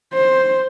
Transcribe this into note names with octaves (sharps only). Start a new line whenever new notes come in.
C5